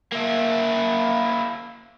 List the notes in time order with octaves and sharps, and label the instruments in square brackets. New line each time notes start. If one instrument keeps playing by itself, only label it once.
[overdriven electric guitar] A#3 E4